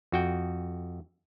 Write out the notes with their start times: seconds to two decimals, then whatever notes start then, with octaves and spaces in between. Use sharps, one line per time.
0.12 F2 F#4 G5